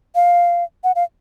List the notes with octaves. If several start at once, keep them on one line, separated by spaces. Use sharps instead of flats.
F5
F#5
F5